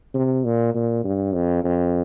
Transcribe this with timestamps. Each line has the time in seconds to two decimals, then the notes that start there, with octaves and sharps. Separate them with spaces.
0.14 C3
0.44 A#2
0.74 A#2
1.04 G2
1.34 F2
1.64 F2